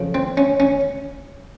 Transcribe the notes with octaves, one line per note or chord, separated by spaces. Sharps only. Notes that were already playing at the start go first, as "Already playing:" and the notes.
Already playing: F2 C#3 F3
C4
C#4
C#4